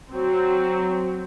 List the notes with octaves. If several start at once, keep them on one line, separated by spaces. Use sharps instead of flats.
F#3 C4